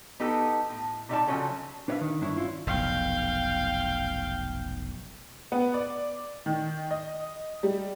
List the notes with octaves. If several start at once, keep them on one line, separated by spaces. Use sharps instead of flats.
B3 D#4 G4 A4
A2
C3 G3 D#4 G4 D5 A5
C#3 F3 F#3 C#4 A4
D4 B4 C#5 D5 E5 F5
D#3 D4
G2 D4 E4 C#5
C#4 E4 F4 C#5
F1 B1 F5 G5
B3
D5
D#3
D#5
G3